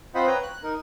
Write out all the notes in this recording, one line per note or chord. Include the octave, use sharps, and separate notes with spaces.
C4 F4 C5 D#5 F#5 B5
B4 C#5 G5 A#5
F#6
D#4 A#4